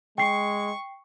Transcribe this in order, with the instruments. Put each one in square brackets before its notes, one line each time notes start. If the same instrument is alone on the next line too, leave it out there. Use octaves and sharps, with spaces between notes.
[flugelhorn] G#3 [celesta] G5 C7 [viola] C#6